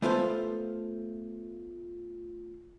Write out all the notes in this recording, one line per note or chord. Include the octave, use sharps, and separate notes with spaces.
A3 B3 F4 A4 C5 F5